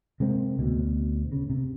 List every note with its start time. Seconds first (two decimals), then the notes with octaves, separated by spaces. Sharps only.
0.20 C3 G#3 A#3 C4
0.59 D2 B2
1.32 C#3
1.50 C3